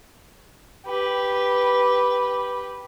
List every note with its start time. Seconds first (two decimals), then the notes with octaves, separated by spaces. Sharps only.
0.86 G4 B4